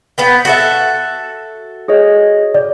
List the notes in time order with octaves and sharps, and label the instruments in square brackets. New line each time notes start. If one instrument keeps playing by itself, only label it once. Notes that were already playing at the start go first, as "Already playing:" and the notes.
[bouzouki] B3 B4 G5
F#4 A4 E5
[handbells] G#4 C#5 D#5
[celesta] D5